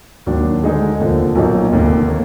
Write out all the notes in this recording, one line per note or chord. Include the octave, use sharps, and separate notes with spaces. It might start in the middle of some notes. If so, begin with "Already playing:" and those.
D#2 D#3 F#3 D4
D2 D3 G#3 D#4 G#4
F1 D#2 D3 F3
B1 A#2 F#3 A#3 D#4
F1 D#2 D3
D#3 A#3